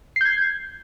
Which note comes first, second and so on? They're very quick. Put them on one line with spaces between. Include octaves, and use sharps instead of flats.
C7 G6 G#6